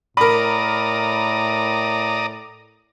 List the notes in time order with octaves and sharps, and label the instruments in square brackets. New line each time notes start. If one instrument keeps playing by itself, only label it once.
[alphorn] A2 [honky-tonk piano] A#4 B5 [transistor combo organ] D5 A#5 D#6